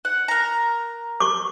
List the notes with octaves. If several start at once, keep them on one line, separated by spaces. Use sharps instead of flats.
F#5
A#4 A#5
C#6 D6